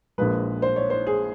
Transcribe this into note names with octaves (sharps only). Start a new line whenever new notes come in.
A#1 A#2 F3 G#3 B4
C5
C#5
C5
G#4